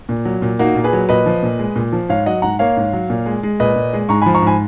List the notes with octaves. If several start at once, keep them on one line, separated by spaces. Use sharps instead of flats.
A#2
F#3
A#2
A#3 D#4 F#4
A#2
G#4 B4
F#3
A#2 B4 D#5
F3
A#2
G#3
A#2
F3
G#2 C#5 F5
F#3 D#5 F#5
G#2 F#5 A#5
A#3 C#5 F5
G#2
F#3
A#2
G#3
G#3
A#2 B4 D#5
A#2
G#3
G#2 A#5 C#6
G#5 B5
F3
A#5 C#6
G#2 G#5 B5